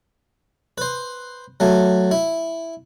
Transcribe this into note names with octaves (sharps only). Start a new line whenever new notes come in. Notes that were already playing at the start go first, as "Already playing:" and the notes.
B4 C5
F#3 A3
E4